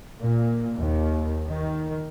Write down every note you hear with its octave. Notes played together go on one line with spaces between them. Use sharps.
A#2
D#2
D#3